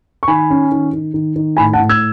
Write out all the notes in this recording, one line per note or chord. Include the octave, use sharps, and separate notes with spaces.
C#6
D#3 G#5 B5
C#4
D#3
D#3
D#3
D#3
A2 G#5 B5
F#5 A5
A2
E6 G#6